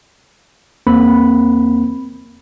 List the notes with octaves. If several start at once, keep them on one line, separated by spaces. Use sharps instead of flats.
E2 A#3 C4 B5